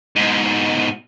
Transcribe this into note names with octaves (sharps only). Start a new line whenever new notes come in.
G#2 B2